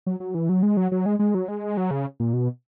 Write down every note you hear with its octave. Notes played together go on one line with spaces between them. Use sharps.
F#3
F#3
E3
F#3
G#3
F#3
F#3
G#3
G#3
F#3
G#3
F#3
C#3
A#2
B2